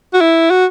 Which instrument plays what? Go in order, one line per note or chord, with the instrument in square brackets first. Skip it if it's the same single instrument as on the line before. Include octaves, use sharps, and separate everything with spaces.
[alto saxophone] F#4
E4
F#4